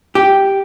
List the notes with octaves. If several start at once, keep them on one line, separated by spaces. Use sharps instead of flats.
G4